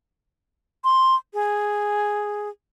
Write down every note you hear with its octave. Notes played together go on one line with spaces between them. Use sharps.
C6
G#4